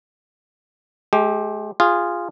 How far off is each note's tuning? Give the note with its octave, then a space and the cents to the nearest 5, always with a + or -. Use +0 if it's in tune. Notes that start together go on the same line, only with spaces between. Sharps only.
G#3 +40 G4 +5
F4 -5 G#4 -15